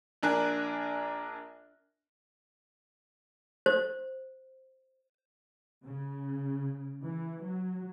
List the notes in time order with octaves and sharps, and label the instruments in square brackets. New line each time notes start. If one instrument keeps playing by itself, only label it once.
[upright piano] A#1 D4 A#4 G#5 F#6
[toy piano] C5
[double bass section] C#3
E3
F#3